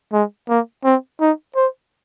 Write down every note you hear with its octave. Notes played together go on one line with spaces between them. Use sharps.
G#3
A#3
C4
D#4
C5